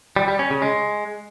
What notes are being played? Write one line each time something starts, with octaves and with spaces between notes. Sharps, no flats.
G3
G3
C#4
C#3
G#3